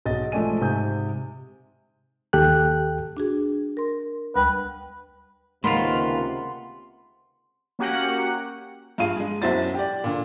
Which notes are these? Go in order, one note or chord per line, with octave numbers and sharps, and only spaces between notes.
B1 G#4 D#5 A6
F3 G#3 A3 D5 G#5 D#7
G#2 C3 G#5 D#6 G6
D#2 G4 A4 G5 F#6
D4 F#4 G#4
A#4 C6
D2 G3 B4 G5
C#2 C3 D#3 A#3 F4 F#5 B5 C6
A#3 C#4 F#4 G4 F#5
G2 F4 G#4 F5 D#7
G#3 G#4
B1 F#2 E4 F#4 C5 A6
G4 D5
A#2 D3